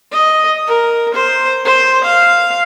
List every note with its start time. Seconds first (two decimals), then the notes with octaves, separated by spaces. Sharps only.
0.12 D#5
0.67 A#4
1.14 C5
1.65 C5
2.04 F5